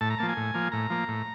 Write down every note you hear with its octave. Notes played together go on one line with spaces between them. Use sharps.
A2 A5
A#5
F3 A#3 A5
G#5
A2
F3 A#3
A2 A#5
F3 A#3
A2